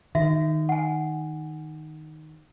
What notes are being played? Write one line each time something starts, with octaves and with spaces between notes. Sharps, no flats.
D#3 F#4 E5
F#5 G#5